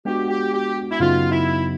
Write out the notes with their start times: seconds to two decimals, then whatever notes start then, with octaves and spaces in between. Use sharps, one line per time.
0.05 G#3 B3 D4 F#4 G4
0.28 G4
0.53 G4
0.91 E4
1.00 F#2 C#3 F#3 B3 D#4 F4
1.31 E4